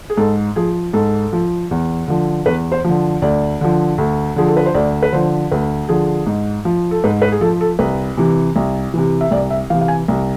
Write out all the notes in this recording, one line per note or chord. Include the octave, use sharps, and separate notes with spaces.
G#4
G#2 A4
F3 G#4
G#2 A4
F3
E2
D3 F3
E2 B4
C5
D3 F3
D2 D5
D3 F3
D2
D3 F3 G#4
A4
B4
C5
D2 D5
B4
D3 F3 C5
D2 B4
D3 F3 G#4
G#2
F3
A4
G#2 B4
B4
G#4
F3 A4
A4
C2 B4
C3 E3
C2
C3 E3
E5
C2 D5
E5
C3 E3 F5
F5
G#5
C2